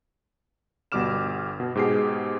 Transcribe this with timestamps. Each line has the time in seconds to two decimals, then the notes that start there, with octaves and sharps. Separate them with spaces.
0.92 G1 B2 G3 D6 F6 E7
1.60 B2
1.75 G#2 B2 G4 G#4 C7